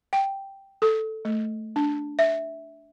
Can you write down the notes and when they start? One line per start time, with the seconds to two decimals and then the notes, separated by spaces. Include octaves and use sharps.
0.13 G5
0.82 A4
1.25 A3
1.76 D4
2.19 E5